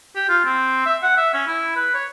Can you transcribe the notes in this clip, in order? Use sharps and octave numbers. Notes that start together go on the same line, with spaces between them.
G4
F4
C4
E5
F#5
E5
C#4
E4
B4
C#5